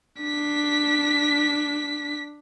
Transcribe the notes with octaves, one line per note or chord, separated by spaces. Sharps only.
D4 B6